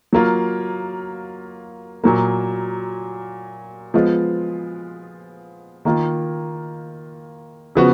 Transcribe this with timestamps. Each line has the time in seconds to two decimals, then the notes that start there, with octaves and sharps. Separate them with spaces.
0.13 F#3 A#3 F4
2.04 A#2 F#3 A#3
3.94 F3 G#3 B3 F4
5.85 D#3 A#3 F4
7.75 C#3 F3 B3 F#4